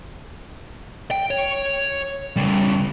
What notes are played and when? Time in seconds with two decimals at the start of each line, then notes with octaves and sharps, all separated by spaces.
1.11 G5
1.31 C#5
2.36 C#3 G3